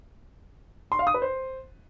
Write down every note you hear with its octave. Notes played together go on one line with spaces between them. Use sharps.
C6
F5
D#6
B4
C5